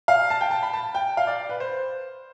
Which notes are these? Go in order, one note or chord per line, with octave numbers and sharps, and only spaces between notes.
F5
A5
G5
A5
B5
A5
G5
F5
D5
B4
C5